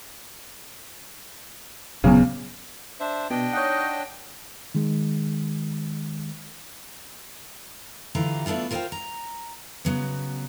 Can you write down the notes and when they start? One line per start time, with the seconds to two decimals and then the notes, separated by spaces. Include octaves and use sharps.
2.04 D1 E2 C#3 F#3 B3
3.00 D4 C5 E5
3.30 B2 D4 D#5 G5
3.53 D#4 C#5 F#5
4.75 D#3 G#3
8.15 D3 E3 F4 G4 A#5
8.46 A3 B3 D4 E4 F4
8.71 F4 A#4 C5 D#5 F5 G5
8.92 A#5
9.85 C#3 F#3 B3